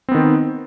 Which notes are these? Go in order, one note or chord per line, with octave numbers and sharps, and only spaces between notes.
D#3 B3 C4